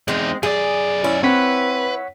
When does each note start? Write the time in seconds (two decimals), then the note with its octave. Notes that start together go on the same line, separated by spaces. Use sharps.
0.08 E2 G#3 C4 D#4
0.43 F#2 G#4 D5
1.04 C#4 E4
1.23 C4 B4 C#5 F#5 B6